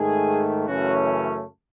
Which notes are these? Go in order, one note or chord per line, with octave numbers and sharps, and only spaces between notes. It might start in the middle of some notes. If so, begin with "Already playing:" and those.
Already playing: G#2 D#3 A3 G#4
F#2 C#3 E3 A3 C#4 F#4